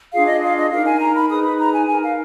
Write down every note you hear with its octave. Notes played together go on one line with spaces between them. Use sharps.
D4 F4 G#4 F5
D#5
F5
D#5
D#4 A#4 F5
G#5
A#5
B5
D#4 G#4 B4 D#6
B5
A#5
G#5
D#4 A#4 G#5
F5